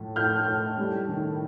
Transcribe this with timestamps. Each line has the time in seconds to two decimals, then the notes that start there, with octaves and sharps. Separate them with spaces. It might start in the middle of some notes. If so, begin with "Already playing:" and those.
Already playing: A2 F3
0.16 A2 F6 G6
0.48 A2
0.78 G3
1.08 D#3